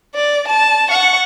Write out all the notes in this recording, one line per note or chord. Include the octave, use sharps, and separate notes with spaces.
D5
A5
F#5 C#6